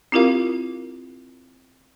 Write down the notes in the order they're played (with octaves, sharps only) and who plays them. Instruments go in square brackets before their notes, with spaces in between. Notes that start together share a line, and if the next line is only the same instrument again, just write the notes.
[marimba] C4 E4 F4 G4 A#4 F5